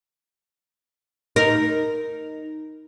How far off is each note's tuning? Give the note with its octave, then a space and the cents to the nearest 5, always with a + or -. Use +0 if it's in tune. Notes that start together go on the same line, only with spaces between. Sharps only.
D#4 +0 A#4 +0